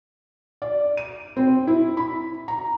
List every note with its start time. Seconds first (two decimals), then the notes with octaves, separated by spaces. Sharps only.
0.62 D5
0.97 D#7
1.37 C4
1.67 E4
1.97 B5
2.48 A#5